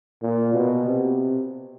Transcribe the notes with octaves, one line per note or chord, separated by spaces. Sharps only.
A#2
B2
C3